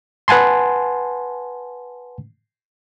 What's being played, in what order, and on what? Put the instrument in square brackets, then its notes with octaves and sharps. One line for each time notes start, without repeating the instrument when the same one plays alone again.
[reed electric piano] B4 F#5 G#5 A5 C6